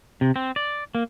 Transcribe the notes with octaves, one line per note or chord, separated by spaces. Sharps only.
C3
C4
D5
A#3